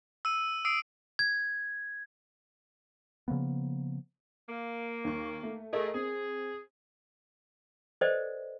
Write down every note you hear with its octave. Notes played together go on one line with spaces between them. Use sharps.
E6 D#7
D#6 E6 C7 D7
G#6
C#3 F3 A#3 B3
A#3
D#2 C#6
A3
A3 G#4 A#4 D#5
C4 G#4
A4 B4 C5 D5 D#5 G5